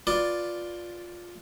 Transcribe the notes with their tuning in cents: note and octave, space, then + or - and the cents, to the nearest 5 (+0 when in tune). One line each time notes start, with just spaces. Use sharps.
F4 +5 B4 +0 D5 +0